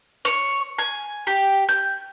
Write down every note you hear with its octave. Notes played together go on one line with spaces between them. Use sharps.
C#5
G#5
G4
G6